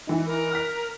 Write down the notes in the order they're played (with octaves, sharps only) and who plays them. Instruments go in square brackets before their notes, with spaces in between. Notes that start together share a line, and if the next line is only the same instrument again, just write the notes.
[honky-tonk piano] E3 D#4
[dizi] A#4
[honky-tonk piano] F6 F#6 B6